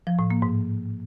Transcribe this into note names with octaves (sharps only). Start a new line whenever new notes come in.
F3
A2
A#3
G#2